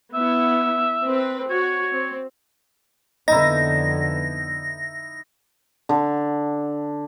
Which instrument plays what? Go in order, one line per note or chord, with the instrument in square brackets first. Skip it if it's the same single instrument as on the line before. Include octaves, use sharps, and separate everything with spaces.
[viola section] B3 E4 [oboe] E5
[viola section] C4 B4
[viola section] F#4 [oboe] C#5
[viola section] C4
[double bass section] F2 D3 B3 [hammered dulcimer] D#4 E4 [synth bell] D#5 [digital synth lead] A#6
[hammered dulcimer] D3